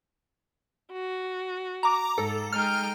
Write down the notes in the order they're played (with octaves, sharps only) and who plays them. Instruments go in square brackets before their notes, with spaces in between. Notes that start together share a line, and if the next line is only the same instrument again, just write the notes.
[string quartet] F#4
[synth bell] A#5 D6
[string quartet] G#2 [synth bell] A4
[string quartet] G#3 D#4 G5 [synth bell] F6